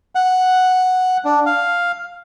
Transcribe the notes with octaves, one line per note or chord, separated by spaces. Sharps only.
F#5
D4
F5